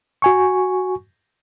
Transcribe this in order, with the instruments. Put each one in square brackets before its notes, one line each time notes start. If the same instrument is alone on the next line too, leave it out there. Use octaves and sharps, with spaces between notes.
[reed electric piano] F#4 G#5 C#6